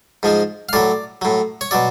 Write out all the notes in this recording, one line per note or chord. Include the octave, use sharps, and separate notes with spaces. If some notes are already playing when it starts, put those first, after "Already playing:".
G#2 F3 G#3
F5
A2 F#3 D5
A2 F#3
C#5
B2 F#3 D5